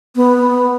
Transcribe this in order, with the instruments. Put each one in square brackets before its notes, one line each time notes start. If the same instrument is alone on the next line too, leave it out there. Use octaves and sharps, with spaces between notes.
[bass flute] B3